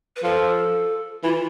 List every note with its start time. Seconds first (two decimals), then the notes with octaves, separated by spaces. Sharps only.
0.16 B4
0.24 F3 A4
1.24 E3 F4